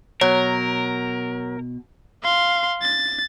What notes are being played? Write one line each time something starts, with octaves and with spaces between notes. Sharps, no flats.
B2 F#3 A#4 C#5
F5 C6
A6